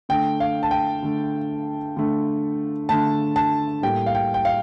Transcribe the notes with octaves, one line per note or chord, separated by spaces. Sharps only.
D3 A3 G5
F5
A5
G5
D3 A3
D3 A3
D3 A3 A5
A5
A2 G3 A#3 G5
F5
G5
G5
F5